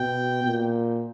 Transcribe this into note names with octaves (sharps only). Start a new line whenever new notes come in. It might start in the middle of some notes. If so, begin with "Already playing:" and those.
Already playing: B2 G5
A#2